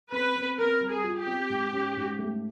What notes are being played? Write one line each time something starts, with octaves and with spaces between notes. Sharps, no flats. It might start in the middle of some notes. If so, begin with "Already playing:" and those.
C4 B4
C4
C4 A#4
G3
G#4
F4
G4
C4
G#2
C#4
G#2
A3